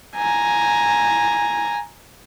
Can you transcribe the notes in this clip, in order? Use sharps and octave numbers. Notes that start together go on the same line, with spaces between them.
G#5 A#5